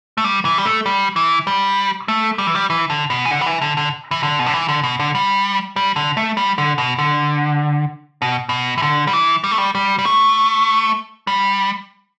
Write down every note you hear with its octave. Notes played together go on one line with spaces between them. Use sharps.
A3
G3
E3
G3
A3
G3
E3
G3
A3
G3
E3
G3
E3
D3
B2
E3
D3
G3
E3
D3
D3
E3
D3
B2
D3
E3
D3
B2
D3
G3
G3
D3
A3
G3
D3
B2
D3
B2
B2
E3
D3
G3
E3
G3
A3
G3
G3
G3
A3
G3